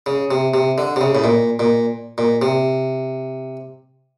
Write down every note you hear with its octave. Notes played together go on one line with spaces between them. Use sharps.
C#3
C3
C3
D3
C3
C#3
A2
A#2
A#2
A#2
C3